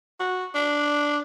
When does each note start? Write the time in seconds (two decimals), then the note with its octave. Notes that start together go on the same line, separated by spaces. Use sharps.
0.20 F#4
0.55 D4